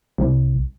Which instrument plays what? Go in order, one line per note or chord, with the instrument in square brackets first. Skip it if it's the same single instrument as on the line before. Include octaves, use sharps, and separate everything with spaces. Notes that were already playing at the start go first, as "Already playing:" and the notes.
[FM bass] C2